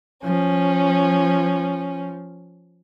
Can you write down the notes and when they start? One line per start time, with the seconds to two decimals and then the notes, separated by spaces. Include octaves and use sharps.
0.24 F3 C#4